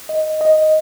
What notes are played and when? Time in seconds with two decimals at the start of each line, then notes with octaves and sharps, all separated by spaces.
0.09 D#5
0.41 D#5